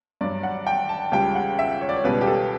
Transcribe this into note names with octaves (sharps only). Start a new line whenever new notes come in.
G2 F#3 D5
F#5
G5
A5
C#2 C#3 G3 G5
F#5
E5
C#5
D5
C#5
C#2 B2 G3 B4
G4
A4